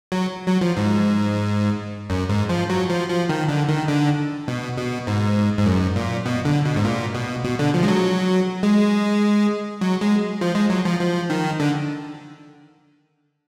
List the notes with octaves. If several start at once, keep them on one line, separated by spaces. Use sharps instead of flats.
F#3
F#3
F3
G#2
F#2
G#2
F3
F#3
F3
F3
D#3
D3
D#3
D3
B2
B2
G#2
G#2
F#2
A#2
B2
D3
B2
G#2
A#2
B2
B2
D3
F3
G#3
F#3
G#3
F#3
G#3
F3
G#3
F#3
F3
F3
D#3
D3